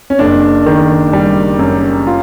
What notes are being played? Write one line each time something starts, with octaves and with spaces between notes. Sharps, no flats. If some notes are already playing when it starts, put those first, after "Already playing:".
C#4
F#1 D4
D#3
G3
F#2
F4